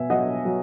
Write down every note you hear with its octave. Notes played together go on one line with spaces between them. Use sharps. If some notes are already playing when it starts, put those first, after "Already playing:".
Already playing: B2 E5 G#5
F#3 D#5 F#5
F#3